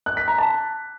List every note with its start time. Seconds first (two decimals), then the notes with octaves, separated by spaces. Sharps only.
0.06 F#6
0.17 B6
0.28 A#5
0.38 A5